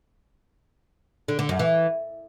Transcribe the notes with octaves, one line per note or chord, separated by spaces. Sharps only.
D3
D3
F#2
E3